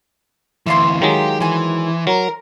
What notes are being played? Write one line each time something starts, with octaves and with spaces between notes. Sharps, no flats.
D2 E3 E4 F4 C6
D#3 F#3 G#3 G4
E3 C5 G#5
F#3 A#4